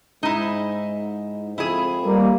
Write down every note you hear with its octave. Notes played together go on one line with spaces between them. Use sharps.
G#2 D#4 E4
F2 E4 G#4
G3 A#3